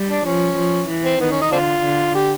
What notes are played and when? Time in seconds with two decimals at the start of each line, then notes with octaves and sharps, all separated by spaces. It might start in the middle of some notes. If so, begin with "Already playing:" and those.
Already playing: G3
0.09 D4
0.25 F3 C#4
0.57 F3
0.88 E3
1.05 C4
1.20 D#3 B3
1.31 C#4
1.41 D#4
1.52 D3 C4 D4 F4
1.83 D3
2.16 G4